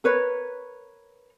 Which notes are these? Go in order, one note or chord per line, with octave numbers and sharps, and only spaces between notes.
A#4 B4 C#5